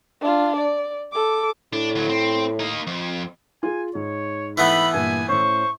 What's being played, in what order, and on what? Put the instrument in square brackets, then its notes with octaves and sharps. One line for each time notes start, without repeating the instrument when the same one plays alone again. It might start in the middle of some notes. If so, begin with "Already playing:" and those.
[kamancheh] D4 F4
D5
A4 D6
[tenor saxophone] A2 [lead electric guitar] D4
[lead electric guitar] D2 F#3
C4
A#3 D#4
F2
[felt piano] F4 G#4 [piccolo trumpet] G#5
[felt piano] G#2 [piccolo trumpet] C#5
[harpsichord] E3 A3 B3 [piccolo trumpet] B5
[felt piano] G2 A#2 [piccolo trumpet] G#5
[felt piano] A2 C#4 [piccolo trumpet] C5 [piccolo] C#6